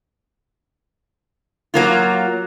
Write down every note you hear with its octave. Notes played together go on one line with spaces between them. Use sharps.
F#3 A#3 F4